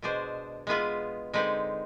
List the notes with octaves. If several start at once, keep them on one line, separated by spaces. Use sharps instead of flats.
B2 G#3 D4 G#4 C5
G#3 B3 F4 G#4 B4
D3 G#3 C4 D#4 B4